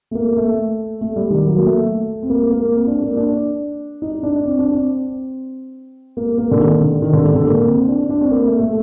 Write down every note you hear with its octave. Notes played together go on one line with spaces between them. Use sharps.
A3
A#3
A3
A3
G3
D#3
F#3
A#3
A3
C4
A#3
A#3
C4
D4
A#3
D4
D#4
D4
C4
D4
C4
A#3
A#3
D3
D#3
D3
D#3
D3
D3
A#3
C4
D4
D4
C4
A#3
A3
A3